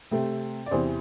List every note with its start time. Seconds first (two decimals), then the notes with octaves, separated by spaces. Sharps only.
0.11 C3 A3 C4
0.66 D5
0.71 E2 C3 E3 C5